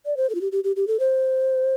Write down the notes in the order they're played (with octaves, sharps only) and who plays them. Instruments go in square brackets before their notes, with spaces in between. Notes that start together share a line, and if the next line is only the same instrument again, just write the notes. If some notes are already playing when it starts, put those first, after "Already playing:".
[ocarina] D5
C5
A4
F4
G4
G4
G4
G4
A4
C5